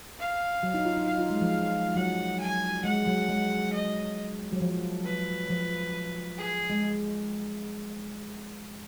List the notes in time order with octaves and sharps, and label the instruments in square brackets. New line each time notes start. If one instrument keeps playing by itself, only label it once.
[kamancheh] F5
[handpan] F#3
D#4
F4
D#4
[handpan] D#4 [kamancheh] F5
[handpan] F4
G#3
F3
[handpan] F#3 [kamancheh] F#5
[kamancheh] G#5
[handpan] G#3 [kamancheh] F#5
[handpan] F#3
G#3
[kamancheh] D#5
[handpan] F#3
F3
[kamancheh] B4
[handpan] F3
[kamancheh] G#4
[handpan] G#3